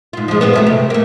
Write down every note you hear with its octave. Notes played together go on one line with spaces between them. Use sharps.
G#2 F4
F3 G#3
B3 C4 F4
F#3 G#3 A3
C3
A3 A#3